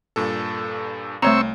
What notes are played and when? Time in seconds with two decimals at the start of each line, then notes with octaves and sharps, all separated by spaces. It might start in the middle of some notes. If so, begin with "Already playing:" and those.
0.16 G2 A#2 A4
1.22 C2 A3 C4 C#5 A#5 C#6 E6